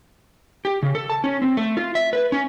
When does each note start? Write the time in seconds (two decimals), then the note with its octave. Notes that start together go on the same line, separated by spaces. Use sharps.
0.65 G4
0.83 C#3
0.95 A4
1.10 A5
1.24 C#4
1.42 C4
1.57 A3
1.77 F4
1.95 E5
2.13 B4
2.32 C#4